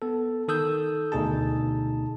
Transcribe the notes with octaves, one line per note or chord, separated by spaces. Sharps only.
B3 A4
D#3 A4 D#6 E6 G6
D2 B2 D#4 G#4 A5